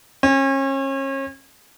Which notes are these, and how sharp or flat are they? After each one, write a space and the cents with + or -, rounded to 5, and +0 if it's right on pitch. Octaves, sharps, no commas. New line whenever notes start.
C#4 -35